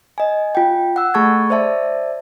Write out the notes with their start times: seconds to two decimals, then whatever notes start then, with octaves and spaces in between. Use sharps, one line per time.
0.18 D#5 G#5
0.55 F4 G5
0.96 F#5 E6
1.14 A3 G#4 A5 C#6 G#6
1.50 C5 D5 E5 A5